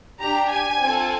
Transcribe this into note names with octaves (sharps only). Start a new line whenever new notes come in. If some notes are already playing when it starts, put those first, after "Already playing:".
D4 G4 A#5
G#5
C4 F4 A4